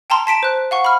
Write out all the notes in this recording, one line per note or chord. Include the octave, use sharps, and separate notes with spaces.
G5 A5 A#5 C6
A5 B6 D7 E7
C5 F#6
F5 F#5 C#6
B5 F6